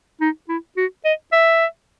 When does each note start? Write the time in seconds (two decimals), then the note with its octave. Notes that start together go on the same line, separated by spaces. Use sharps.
0.21 D#4
0.49 E4
0.77 F#4
1.04 D#5
1.32 E5